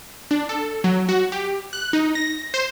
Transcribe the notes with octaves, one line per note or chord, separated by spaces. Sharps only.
D4
A4
F#3
F#4
G4
F#6
D#4
A#6
C5